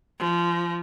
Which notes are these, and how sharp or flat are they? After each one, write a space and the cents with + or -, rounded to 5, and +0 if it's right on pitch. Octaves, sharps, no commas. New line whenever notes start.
F3 -20